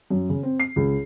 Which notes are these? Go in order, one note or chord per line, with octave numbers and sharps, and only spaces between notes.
F#2
C#3
C4
C7
C#2